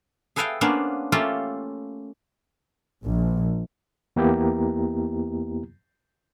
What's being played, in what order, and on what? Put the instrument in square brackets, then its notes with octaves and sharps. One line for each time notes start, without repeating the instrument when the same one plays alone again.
[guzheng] G#4 A4 B4 E5 F5 G5
A#3 B3 C#4 D4 B4 C5
A3 A#3 C#4 F4 G4 A4
[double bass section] A#1
[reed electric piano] E2 A#3 B3 E4 G4 A#5